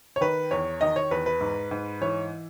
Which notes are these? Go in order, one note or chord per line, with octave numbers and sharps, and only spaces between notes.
C#5
D#3 B4
E2 C#5
D#3 D#5
C#5
E2 B4
B4
G#2
G#2
E3 C#5